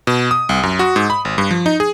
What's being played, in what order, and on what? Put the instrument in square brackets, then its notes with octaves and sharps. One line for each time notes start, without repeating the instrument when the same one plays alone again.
[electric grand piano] B2
D#6
C2
F#2
F#4
G#2
B5
G#1
G2
F3
D#4
G#4